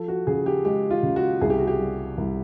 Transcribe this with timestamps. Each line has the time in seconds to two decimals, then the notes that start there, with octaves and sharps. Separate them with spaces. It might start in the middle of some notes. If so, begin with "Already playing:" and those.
Already playing: F3 A4
0.08 F#4
0.27 C#3 G#4
0.46 G4
0.65 G#3 G4
0.90 F4
1.03 C#3
1.16 F#4
1.41 C2 G#4
1.50 G4
1.59 F#4
1.67 G4
1.80 G3
2.17 C2